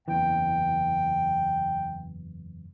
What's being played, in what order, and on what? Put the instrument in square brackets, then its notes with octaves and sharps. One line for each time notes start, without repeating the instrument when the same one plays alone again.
[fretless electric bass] F#1 E2 E3 [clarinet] G5